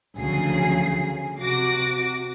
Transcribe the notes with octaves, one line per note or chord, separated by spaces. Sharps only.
D2 C#3 F3 F#3 G#4 C7
C3 F#4 D6 A#6